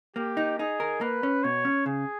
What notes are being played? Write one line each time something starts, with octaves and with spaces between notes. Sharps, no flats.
A#3 G4
D#4
D#4 G#4
A#4
A#3 B4
C#4
B2 C#5
C#4
C#3 G#4